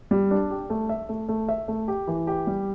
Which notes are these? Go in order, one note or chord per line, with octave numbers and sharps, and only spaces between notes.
G3
D4
G4
A3
E5
A3
A3
E5
A3
G4
E3
G4
G3